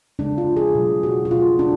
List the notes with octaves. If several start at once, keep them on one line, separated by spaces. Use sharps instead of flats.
C#3 G#3 D4
F4
G#4
B2 F#3 A3
F#4
F#4
B2 A3 F4
D4